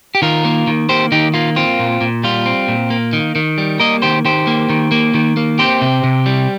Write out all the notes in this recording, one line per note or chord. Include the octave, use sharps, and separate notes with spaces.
G4
D#3 F4 A#4
A#3
D#3
A#3 G4 C5
D#3 D#4 G4
A#3 F4
C4 F4
A#2
A#2
G3 F4
C4
A#2
A#3
D#3
D#3
G3
A#3 A#4 D#5
D#3 G4 C5
D#3 G4 C5
A#3
D#3
A#3
D#3
A#3
C4 G4 C5
C3
C3
G3